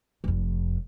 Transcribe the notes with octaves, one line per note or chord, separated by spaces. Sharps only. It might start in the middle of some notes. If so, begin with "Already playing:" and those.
F1 F2